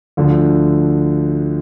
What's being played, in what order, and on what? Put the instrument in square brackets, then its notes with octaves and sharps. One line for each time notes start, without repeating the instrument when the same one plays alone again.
[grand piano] D2 D3 F3